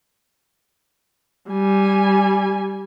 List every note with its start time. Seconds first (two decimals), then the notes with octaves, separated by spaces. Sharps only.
1.50 G3 G#5